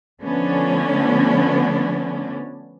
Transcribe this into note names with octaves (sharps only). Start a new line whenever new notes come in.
D3 F3 A3 B3 C#4 D4